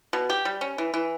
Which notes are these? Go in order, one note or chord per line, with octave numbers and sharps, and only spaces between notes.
B2
G4
G3
C#4
E3
E3